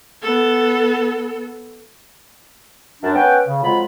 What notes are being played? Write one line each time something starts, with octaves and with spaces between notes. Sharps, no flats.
B3 A4
F#2 D4
B3 C#4 B4 G5
C#3
F2 F#3 G#3 F4 B5